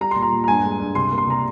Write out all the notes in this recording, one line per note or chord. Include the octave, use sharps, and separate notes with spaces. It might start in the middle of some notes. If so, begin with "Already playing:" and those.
G3 A#5
A#2 C6
A#5
A#2
A#5
G2 G#5
G#3
G2
C3 C6
A#3
C6
C3 A#5